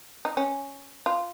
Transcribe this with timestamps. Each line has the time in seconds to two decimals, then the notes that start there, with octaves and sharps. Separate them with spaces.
0.25 D#4
0.37 C#4
1.06 F4